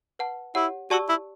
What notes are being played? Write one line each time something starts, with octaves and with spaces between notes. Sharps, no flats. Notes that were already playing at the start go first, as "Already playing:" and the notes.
B4 F#5 A5
E4 G4 C#5 F#5
F#4 G4 D5 A5 C#6 E6
E4